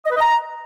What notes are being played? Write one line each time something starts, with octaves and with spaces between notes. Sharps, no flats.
D#5
B4
D#5
A#5